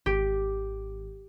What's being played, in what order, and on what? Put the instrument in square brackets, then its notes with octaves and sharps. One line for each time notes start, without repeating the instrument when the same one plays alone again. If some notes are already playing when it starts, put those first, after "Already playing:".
[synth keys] G#1 [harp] G4